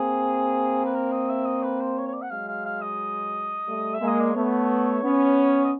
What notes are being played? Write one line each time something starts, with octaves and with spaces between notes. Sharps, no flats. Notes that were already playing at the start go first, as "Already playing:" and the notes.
Already playing: A#3 C4 G#4
B4
A#4
D#5
E5
D#5
B4
C5
C#5
C#5
D5
F#5
F#3 G#3 F5
F5
F5
D#5
G3 A3
E5
G#3 A#3
D#5
D5
A3 B3 C#5
B3 C#4
D#5